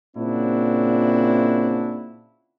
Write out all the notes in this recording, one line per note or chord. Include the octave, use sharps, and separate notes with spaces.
A#2 C#3 C4 D4 E4 F#4